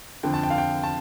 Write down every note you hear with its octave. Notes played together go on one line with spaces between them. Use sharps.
F2 D3 G5
A5
G5
F5
G5
A5